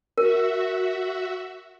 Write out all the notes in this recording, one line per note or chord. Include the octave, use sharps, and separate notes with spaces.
F#4 A#4 E5